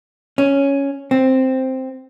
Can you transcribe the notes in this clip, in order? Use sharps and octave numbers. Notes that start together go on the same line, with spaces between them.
C#4
C4